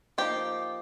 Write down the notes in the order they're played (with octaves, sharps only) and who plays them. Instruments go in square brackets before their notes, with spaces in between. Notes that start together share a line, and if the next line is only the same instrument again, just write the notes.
[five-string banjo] F3 A#3 D#4 G4